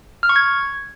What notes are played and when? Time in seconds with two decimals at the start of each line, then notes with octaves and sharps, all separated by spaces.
0.23 F6
0.29 C#6
0.36 G#6